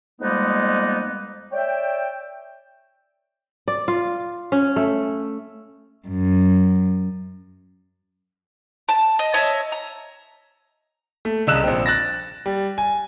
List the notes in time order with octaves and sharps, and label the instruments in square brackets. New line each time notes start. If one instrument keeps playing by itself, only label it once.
[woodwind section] F2 G3 G#3 A#3 B3 D#4
C#5 D5 E5 G5
[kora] D5
F4
C#4
A3
[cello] F#2
[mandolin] A5
D#5
C#5 D#5 E5 A5
A#5
[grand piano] A3
C2 C#3 D#5 E6 F#6 E7
A#1 C4
F#6 A6 A#6
G3
G#5